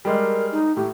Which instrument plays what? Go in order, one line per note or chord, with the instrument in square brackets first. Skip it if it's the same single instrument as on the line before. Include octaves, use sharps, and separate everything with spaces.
[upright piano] G3 G#3 [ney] A#4
[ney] D#4
[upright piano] A2 [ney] G4